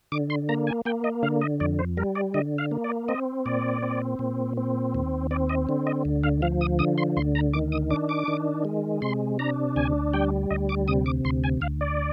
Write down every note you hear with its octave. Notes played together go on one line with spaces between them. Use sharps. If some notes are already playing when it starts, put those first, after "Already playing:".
D3 D6
C6
A#3 A#5
G#5
A#3 G5
D#5
D3 F5
D#5
F2 D5
C5
G3 A#4
D5
D3 D#5
F5
A#3
D5
C4 D#5
A#2 D5
C4
A#2
C4
D#2
C4 D5
D#5
D3
D#5
D2
F5
F3 F5
D#6
D3 D#6
C6
D2 C6
A#5
D#3 D6
D#6
D4 D6
D6
D#3
G#3
C3 C6
D4 A#5
D2 G#5
G3 G5
D2 D#5
D6
C3 D#6
D6
D2 C6
G#5
D2 F5
D5